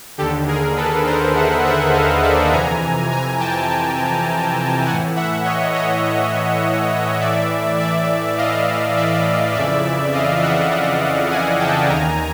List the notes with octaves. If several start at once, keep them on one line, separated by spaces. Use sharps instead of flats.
D#2 D3 G4 A4
G#4 A#4
A4 B4
A#4 C5
E5 F#5
E5 F#5
D#5 F5
D5 E5
F2 C3 E3 G#5 A#5
G#5 A#5
G5 A5
A2 E3 F#5 G#5
E5 F#5
C#5 D#5
C#5 D#5
A2 E3 D5 E5
D5 E5
D#5 F5
D5 E5
F2 C#3 E3 D5 E5
D#5 F5
E5 F#5
E5 F#5
F#5 G#5
G5 A5
D#2 D#3 G#5 A#5